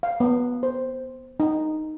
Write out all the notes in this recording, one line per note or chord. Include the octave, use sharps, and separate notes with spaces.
F5
B3
C5
D#4